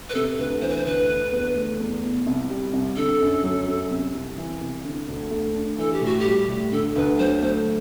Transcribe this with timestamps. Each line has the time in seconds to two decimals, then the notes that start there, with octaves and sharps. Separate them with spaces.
0.10 B4
0.15 C3 A4
0.39 D2 B4
0.62 E3 C5
0.70 B4
0.76 C5
0.85 D2 B4
1.09 D3
1.33 E2
1.56 A3
1.80 E2
2.03 B2
2.26 C2
2.50 G3
2.73 C2
2.96 D3 A4
3.20 F#2
3.44 F#3
3.67 F#2
3.91 C3
4.14 C2
4.38 E3
4.61 C2
4.84 D3
5.08 D2
5.31 A3
5.55 D4
5.78 E3 A4
5.92 G4
6.02 A2 F#4
6.20 G4
6.25 G3
6.49 A2
6.72 D3 A4
6.96 D2 B4
7.19 F#3 C5
7.42 A3 C5